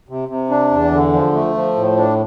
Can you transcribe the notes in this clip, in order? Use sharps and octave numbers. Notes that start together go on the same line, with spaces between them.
C3
C3
D4
E2
D3
F3
A3
F3
A2
D4